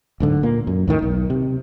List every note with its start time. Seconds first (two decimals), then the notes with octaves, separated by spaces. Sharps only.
0.20 D1 G#2 D3
0.43 A#2 A#3
0.67 F#2
0.88 D#2 A2 D#3
1.02 B1
1.30 C3